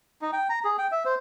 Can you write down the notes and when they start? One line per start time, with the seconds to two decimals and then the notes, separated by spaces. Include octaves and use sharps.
0.22 D#4
0.33 G5
0.50 A#5
0.65 G#4
0.78 G5
0.92 E5
1.05 C5